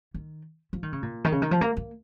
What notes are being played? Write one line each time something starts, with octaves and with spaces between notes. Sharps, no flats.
D#3
F3
D#3
C#3
A#2
D#3
C#3
D#3
F3
A#3
A#3